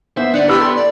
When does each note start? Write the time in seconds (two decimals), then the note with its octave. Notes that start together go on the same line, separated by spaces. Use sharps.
0.17 B3 C5 E5
0.34 D3 B3 D5 F#5
0.48 E4 G4 B4 D5 B5 E6
0.60 A4 G5 C6
0.75 D5